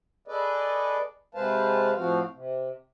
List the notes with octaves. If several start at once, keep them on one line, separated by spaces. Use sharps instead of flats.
G#4 A4 B4 D5 D#5
C3 G#3 B4 C5 F5 A5
A2 F3 C4 F#4 F5
C3